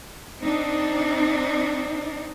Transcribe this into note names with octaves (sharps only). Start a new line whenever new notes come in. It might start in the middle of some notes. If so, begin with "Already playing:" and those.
C4 D4 D#4